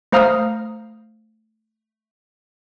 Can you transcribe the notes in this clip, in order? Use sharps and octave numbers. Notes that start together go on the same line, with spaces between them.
A3 C5 F5 A#5 D#6 F6